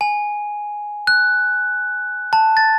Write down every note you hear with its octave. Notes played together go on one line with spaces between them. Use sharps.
G#5
F#6
A5
A6